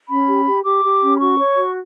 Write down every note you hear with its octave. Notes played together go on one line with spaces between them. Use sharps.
C#4 B5
G4
G4
G4 D6
G4
C#4
B5
F#4 C#6
C#5
F#4